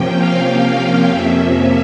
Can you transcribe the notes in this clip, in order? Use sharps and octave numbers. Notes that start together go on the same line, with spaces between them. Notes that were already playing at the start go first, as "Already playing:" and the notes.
Already playing: C3 F3 A#3 C#4 G5
F5
F2 C3 F3 A#3 C#4 E5